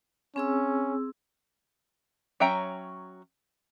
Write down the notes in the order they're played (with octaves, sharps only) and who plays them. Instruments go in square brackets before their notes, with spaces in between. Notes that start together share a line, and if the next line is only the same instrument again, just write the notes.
[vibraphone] C4 G#4 E6 [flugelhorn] C#4
[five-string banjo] F#3 C#4 E5 G5 A#5